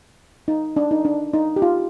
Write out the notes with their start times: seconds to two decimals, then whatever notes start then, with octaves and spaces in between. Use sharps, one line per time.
0.48 D#4
0.76 D4
0.91 D#4
1.05 D4
1.33 D#4
1.56 G4
1.62 F4